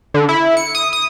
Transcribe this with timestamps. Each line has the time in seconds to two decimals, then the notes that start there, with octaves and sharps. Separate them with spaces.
0.14 D3
0.29 E4
0.57 C#7
0.75 D#6
0.93 D#6